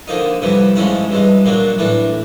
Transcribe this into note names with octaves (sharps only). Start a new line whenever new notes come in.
D3 F3 A#3 D#4
F2 C3 E3 G3
G#2 F3 G#3 C#4 E4
G2 E3 G#3
A#2 F#3 A#3 D4
A2 E3 A3 D4